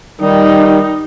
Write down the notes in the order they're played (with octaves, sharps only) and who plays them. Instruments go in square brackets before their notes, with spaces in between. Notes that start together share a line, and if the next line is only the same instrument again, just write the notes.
[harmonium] D#3 G3 [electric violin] D#4